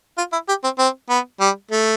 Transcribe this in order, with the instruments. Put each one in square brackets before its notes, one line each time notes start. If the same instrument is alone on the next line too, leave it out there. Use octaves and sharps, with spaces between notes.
[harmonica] F4
E4
G4
C4
C4
B3
G3
A3